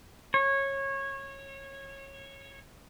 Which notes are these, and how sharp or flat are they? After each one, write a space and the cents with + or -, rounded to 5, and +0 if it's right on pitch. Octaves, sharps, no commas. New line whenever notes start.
C#5 -20